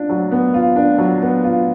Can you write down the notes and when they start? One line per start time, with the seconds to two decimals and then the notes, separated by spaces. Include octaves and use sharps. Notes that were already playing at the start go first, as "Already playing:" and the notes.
Already playing: D4 F4
0.09 F#3
0.31 B3
0.54 F4
0.76 D4
0.98 F#3
1.22 B3
1.44 F4